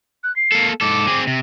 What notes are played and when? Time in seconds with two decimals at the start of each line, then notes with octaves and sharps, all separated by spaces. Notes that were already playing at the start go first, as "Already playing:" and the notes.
0.24 F#6
0.36 C7
0.52 A#3 A4
0.81 G#2 A4 D6
1.07 C4 G#4
1.27 C3